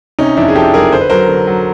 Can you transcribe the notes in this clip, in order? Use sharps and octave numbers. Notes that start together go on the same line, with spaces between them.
C3 C#4 D#4
F2 D4 E4
G#4
F3 G4 A4
F#1 G#4 A#4
D3 C5
B4
F#3 A#4 C5
D3
F#3